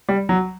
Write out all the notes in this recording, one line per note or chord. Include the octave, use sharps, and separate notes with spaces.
G3
F#3